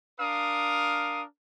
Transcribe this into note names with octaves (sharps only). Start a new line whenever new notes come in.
D4 A#4 F5 D#6